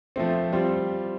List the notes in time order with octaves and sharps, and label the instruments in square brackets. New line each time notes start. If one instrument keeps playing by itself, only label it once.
[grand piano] F3 A3 C4
G3 C4 F4